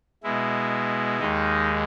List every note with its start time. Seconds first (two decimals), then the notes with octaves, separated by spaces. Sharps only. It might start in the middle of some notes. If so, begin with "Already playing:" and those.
0.23 B2 G#3 E4
1.19 D#2 D#3 G#3 D#4